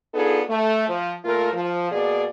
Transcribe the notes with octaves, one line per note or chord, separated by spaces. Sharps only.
B3 D4 D#4 F4 G#4 A4
A3
F3
A#2 A3 F4 A#4
F3
B2 A#3 G#4 D5